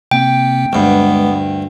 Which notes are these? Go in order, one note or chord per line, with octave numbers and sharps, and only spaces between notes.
C3 A#3 C4 G5
D2 G2 G#3 B3